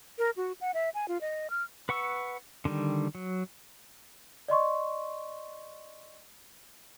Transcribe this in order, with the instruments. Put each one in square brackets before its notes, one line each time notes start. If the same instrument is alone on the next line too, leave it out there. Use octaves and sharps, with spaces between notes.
[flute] A#4
F#4
F#5
E5
G#5
F4
D#5
F6
[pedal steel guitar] B4 F#5 C#6 E6
D3 D#3 G3
F#3
[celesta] D5 D#5 C6 C#6